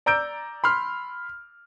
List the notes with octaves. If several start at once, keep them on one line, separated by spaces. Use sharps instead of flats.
D5 A#5 E6 G6 D7
B5 C6 F6